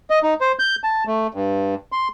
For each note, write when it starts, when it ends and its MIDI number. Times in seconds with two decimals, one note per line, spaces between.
0.10 0.19 75
0.23 0.34 63
0.41 0.52 72
0.59 0.76 91
0.84 1.04 81
1.07 1.27 57
1.34 1.75 43
1.92 2.08 84